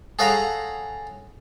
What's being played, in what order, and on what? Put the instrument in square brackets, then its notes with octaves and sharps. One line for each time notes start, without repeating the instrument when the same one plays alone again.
[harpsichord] G#4 A4 C#5 F5 F#5 A#5